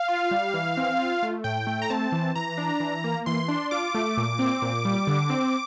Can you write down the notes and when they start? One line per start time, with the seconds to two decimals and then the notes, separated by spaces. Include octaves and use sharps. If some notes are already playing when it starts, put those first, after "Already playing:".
Already playing: F5
0.08 F4
0.31 G3
0.54 E3
0.77 C4
0.99 F4
1.23 A3
1.44 A2 G5
1.67 A3
1.82 A#5
1.90 C4 A5
2.12 E3
2.36 E3 A#5
2.58 D4
2.80 E3
3.04 A#3
3.26 E3 C6
3.48 D4
3.71 F4 D6
3.95 A3
4.17 A#2
4.39 C4
4.62 A#2
4.85 G3
5.07 D3
5.30 C4